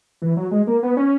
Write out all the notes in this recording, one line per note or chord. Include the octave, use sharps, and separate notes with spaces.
E3
F#3
G#3
A#3
B3
C#4